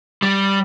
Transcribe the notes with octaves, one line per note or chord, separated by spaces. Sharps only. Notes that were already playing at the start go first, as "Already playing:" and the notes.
G3